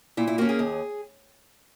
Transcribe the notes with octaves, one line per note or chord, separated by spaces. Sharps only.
A#2 E4
E4
A#3 C#4 F#4
G#4
D#2